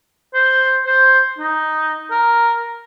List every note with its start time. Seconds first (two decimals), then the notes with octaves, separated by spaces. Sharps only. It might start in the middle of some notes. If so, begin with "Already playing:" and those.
0.34 C5
0.86 C5
1.38 D#4
2.11 A#4